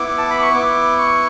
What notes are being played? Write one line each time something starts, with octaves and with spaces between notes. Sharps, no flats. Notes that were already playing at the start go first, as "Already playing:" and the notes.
Already playing: B3 E4 D6
A5
B5
C#6
B3 E4 D6
C#6